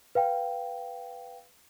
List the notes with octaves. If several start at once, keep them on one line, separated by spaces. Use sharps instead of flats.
B4 F5 G5